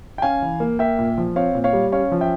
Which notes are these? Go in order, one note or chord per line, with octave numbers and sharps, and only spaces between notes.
G5
C#4 F5 G#5
E3
A#3
A#3 E5 G5
A#2
F3
C4 C#5 F5
A#2
C#5 F5
G3
C#4 C#5 F5
F3
E5 G5